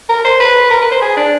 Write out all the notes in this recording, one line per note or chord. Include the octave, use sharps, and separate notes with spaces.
A#4
C5
B4
A#4
B4
C5
G#4
D4